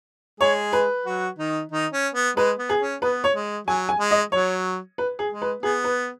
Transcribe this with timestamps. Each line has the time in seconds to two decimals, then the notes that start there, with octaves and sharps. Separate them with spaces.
0.40 G#3 G#4 C#5
0.73 B4
1.06 F#3 F#4
1.38 D#3 D#4
1.71 D#3 D#4
1.93 C#4
2.15 B3
2.37 G#3 B4
2.59 B3
2.69 G#4
2.80 C#4
3.02 B3 B4
3.24 C#5
3.35 G#3
3.67 F#3 G#5
3.89 G#5
4.00 G#3
4.11 D#5
4.32 F#3 C#5
4.98 B4
5.19 G#4
5.30 G#3
5.42 B4
5.63 B3 G#4
5.84 B4